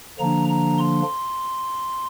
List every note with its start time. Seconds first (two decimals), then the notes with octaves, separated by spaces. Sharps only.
0.19 D3 F3 A#3 D4 A#5
0.49 A#5
0.78 C6